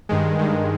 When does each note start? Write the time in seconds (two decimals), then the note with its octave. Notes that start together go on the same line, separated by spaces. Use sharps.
0.09 G2 D#3 G#3
0.39 G2 D#3 G#3